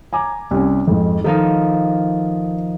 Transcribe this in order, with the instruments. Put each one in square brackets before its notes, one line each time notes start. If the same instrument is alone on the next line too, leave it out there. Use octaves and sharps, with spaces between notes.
[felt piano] G#5 A#5 D6
C2 C#4
F2 G#2
[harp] D#3 F3 D#4 [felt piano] A4